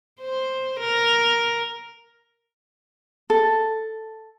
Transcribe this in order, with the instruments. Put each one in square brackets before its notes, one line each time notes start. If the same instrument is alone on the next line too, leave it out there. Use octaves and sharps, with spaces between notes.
[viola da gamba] C5
A#4
[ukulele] A4